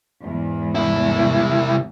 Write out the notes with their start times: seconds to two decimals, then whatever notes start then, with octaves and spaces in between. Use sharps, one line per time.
0.24 E2 G#2
0.75 C2 E4